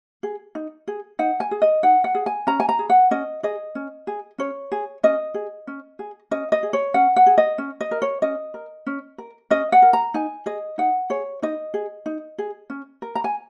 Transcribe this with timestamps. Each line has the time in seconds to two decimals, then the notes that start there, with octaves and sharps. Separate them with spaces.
0.23 G#4
0.55 D#4
0.87 G#4
1.19 D#4 F#5
1.40 G#5
1.51 G#4
1.62 D#5
1.83 D#4 F#5
2.04 F#5
2.15 G#4
2.26 G#5
2.47 C#4 A#5
2.60 G#5
2.69 A#5
2.79 G#4
2.90 F#5
3.11 C#4 D#5
3.43 G#4 D#5
3.75 C#4
4.07 G#4
4.38 C#4 C#5
4.72 G#4
5.03 C#4 D#5
5.34 G#4
5.67 C#4
5.99 G#4
6.31 C#4 D#5
6.52 D#5
6.63 G#4
6.73 C#5
6.94 C#4 F#5
7.16 F#5
7.26 G#4
7.38 D#5
7.58 C#4
7.81 D#5
7.91 A#4
8.02 C#5
8.22 C#4 D#5
8.54 A#4
8.86 C#4
9.18 A#4
9.50 C#4 D#5
9.72 F#5
9.82 A#4
9.93 A#5
10.14 D#4 G#5
10.46 G#4 D#5
10.78 D#4 F#5
11.10 G#4 C#5
11.42 D#4 D#5
11.74 G#4
12.06 D#4
12.38 G#4
12.70 C#4
13.02 A#4
13.15 A#5
13.24 G#5